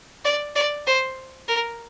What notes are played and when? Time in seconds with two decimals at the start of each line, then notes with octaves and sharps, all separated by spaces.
0.24 D5
0.55 D5
0.86 C5
1.48 A#4